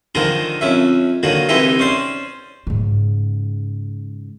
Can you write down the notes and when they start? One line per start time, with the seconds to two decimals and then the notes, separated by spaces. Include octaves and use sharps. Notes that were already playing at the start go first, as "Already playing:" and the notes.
0.15 D3 D#3 F3 G#3 A#4
0.61 F2 C#4 E5
1.23 D3 D#3 F#3 A#3
1.49 C2 E3 G#3 D#4 G4 E5
1.79 C#4 C5 D5
2.67 G#2 C#3